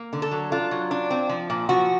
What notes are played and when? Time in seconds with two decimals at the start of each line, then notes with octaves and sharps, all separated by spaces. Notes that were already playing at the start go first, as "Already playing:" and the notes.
Already playing: A#3
0.13 D3
0.22 A4
0.31 F#3
0.52 D4 F4
0.71 F#3
0.91 D4
1.10 C4
1.29 F3
1.50 A#2
1.69 F3 F#4